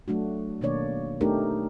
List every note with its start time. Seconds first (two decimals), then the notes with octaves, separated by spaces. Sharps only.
0.08 F#3 A3 D4 F#4
0.61 B2 D#3 A#3 D4 C#5 D5
1.21 A3 B3 D4 D#4 G4 A#4